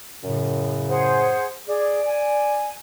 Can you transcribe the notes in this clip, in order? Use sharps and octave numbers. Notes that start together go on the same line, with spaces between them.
F#2 A2 C#3
G#4 C5 F#5
G#4 D5
G#5